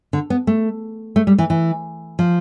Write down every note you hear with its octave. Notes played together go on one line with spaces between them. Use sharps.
D3
B3
A3
A3
G3
E3
E3
F3